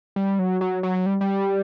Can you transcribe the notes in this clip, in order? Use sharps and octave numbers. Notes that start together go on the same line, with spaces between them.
G3
F#3
F#3
F#3
G3
G3